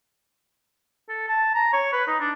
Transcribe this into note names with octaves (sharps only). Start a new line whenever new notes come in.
A4
A5
A#5
C#5
B4
D#4
D4